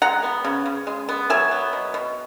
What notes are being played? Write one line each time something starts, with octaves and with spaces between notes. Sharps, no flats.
G#3 F#5 A#5
B3
C#3
C#3
G#3
B3
F#3 E5 G#5
B3
B2
B2